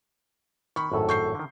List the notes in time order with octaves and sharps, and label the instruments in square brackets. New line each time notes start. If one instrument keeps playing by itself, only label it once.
[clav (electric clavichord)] D#3 [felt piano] B5 C#6
[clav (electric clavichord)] G#1 F#2 A2 [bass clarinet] A4
[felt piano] C#6 G6 C7
[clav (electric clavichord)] D3 D#3